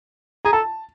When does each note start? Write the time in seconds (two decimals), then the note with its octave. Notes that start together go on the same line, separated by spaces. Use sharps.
0.45 G#4 A#5
0.53 A4 A5